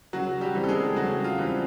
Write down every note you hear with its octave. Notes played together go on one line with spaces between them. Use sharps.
C#3 F#3 F#4
G3 G4
E3 G3 C4
A4
G#3 G#4
C#3 F#3 F#4
F4
E3 G3 C4